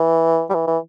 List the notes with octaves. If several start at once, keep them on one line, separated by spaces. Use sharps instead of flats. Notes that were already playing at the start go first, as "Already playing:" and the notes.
Already playing: E3
G3
E3
E3